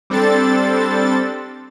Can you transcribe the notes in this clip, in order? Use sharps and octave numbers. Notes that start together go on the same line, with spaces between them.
G3 C4 D4 A4 A6